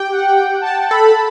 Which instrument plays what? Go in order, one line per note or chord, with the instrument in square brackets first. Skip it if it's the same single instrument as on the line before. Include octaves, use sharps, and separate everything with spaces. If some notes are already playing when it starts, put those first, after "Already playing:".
Already playing: [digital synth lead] G4 [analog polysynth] G5
[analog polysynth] F#5
G5
A5
[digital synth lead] A4 [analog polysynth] B5
[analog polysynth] A5